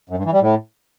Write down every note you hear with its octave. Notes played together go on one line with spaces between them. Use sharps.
F#2
G2
E3
G3
A2